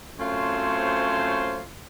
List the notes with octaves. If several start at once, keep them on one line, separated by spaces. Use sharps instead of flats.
F#2 A3 C4 F4 C5 C#5